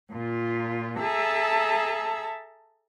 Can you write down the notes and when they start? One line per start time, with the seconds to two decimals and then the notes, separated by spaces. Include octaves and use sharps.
0.11 A#2 F4
1.00 G#4 A4 E5 A5 A#5 E6